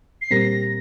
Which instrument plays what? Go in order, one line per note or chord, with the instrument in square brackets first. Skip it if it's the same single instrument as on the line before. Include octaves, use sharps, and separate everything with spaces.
[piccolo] C7
[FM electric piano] A#2 G3 C4 G4 A#4 [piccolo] A#6